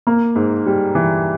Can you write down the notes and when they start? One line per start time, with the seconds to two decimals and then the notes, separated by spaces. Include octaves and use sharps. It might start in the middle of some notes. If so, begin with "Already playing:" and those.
0.07 A#3
0.36 G#2
0.66 G3
0.95 E3